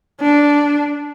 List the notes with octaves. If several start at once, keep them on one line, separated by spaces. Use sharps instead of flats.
D4